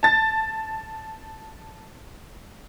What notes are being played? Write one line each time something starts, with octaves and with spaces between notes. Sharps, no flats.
A5 A6